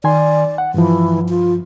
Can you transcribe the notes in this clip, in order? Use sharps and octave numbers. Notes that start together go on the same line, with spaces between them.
D#3 D5 G#5 C6
F#5
G2 E3 F3
F4